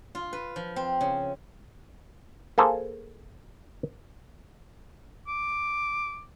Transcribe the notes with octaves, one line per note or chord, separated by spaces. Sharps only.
F4
B4
F3
C4
C#3
A#3 G#4 A4 C5
D6